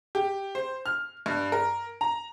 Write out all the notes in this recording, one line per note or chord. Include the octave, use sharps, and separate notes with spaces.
G4
C5
F6
G2
A#4
A#5